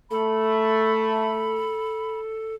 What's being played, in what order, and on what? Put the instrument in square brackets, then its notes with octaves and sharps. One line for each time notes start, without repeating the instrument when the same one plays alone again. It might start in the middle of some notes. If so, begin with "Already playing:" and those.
[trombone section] A3 [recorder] A4 [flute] B5